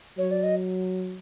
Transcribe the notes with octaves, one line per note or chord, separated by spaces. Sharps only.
F#3 C#5
D5
D#5